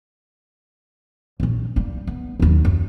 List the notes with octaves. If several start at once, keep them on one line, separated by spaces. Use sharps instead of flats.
A#1 C#4
G3 A#3
B3
D#2 F#3
F#2